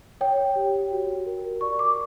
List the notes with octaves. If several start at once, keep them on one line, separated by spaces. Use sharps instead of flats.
C#5 G5
G4
F#4
A#4
D5 C#6
D6